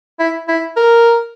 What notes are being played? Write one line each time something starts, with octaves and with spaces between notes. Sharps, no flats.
E4
E4
A#4